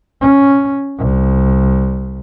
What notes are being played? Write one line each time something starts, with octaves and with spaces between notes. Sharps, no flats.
C#4
C2